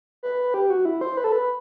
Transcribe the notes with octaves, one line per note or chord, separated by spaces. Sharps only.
B4
G4
F#4
E4
C5
B4
A4
B4